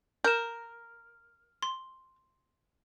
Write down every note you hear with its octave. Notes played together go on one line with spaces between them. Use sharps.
A#4 G6 E7
C6